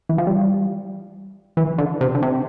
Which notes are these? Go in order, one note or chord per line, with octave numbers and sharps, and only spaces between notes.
E3
F3
G3
E3
D3
C3
D3
C3